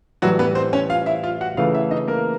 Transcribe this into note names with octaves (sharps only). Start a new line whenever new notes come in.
A2 E3 F#3 G3 F#4
B3 B4
C4 C5
C#4 C#5
F4 F5
E4 E5
F4 F5
F#4 F#5
C#3 E3 A3 F4 F5
E4 E5
D#4 D#5
A#3 A#4